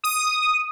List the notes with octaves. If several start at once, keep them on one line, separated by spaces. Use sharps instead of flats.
D#6